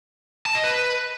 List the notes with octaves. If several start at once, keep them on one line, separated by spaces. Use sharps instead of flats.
A5
D#5
B4